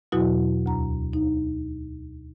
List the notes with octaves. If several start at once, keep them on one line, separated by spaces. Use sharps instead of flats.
E2 B2 F#3 E4 F#4
D2 A#5
D#4